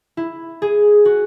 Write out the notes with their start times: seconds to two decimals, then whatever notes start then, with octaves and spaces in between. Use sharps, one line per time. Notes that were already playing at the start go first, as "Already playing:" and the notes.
0.17 E4
0.62 G#4
1.05 F#4